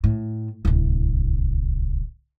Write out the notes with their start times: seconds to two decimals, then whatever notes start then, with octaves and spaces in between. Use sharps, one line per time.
0.04 A2
0.65 D1 C2